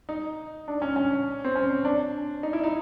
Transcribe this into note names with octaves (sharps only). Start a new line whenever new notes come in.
D#4
D4
C#4
C#4
C4
C#4
D4
D#4
E4
D#4